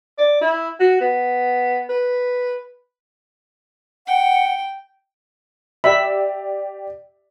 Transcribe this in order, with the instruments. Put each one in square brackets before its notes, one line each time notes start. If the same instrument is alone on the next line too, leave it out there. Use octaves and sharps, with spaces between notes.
[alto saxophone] D5
E4
F#4
B3
B4
[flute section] F#5 [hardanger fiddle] G5
[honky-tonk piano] G4 D5 [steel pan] E5 B5